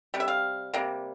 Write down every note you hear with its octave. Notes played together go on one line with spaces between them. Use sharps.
C3 G3
E5
F5
C3 G3 A#3